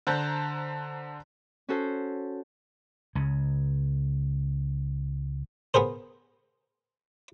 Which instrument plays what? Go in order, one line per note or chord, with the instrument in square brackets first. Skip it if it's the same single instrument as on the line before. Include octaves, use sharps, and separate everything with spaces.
[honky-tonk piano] D3 C5 A5 A#5 F#6 G6
[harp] C#4 F#4 A4 C5
[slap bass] C#2 C#3
[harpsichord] B3 G#4 A#4 C5